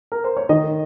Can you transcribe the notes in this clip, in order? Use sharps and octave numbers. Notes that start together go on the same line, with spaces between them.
A#4
C5
C#5
D#3 D#5